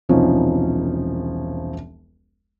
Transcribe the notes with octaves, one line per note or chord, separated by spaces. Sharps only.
E1 C2 F3 C#4 D#4